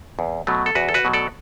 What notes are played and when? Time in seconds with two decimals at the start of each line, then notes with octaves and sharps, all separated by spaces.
0.19 E2
0.47 B2 F#3 A3
0.66 A4
0.75 E2 F#4 B4
0.89 A4
0.94 F#4 B4
1.05 B2 F#3 A3
1.13 A4 D5